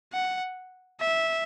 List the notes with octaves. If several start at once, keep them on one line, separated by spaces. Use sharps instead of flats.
F#5
E5